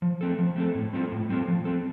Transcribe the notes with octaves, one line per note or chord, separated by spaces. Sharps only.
F3
A3 C4 A4
F3
A3 C4 A4
A2
G3 C4 F4 A4
A2
G3 C4 F4 A4
F3
C4 A4